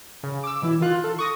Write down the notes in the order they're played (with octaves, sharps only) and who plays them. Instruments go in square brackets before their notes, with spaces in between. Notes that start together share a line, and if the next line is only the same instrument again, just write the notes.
[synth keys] C#3
D6 E6
B2 E3 E4
D#3 F4 F#6
A4
C#6 D#6 A#6